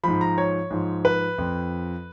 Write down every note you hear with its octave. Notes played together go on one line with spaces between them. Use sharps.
G#2 F3 B5
A#5
C#5
G#2 F3
B4
F2 F3